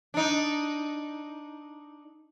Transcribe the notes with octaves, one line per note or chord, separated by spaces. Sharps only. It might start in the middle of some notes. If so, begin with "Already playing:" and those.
D4 D#4